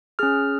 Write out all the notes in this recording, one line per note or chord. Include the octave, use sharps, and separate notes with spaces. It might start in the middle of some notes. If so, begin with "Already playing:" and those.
C#4 G#4 F6